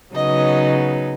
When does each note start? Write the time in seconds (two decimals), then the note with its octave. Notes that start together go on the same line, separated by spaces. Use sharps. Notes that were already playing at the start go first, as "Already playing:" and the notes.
0.15 C#3 F#3 B3 D#4 D#5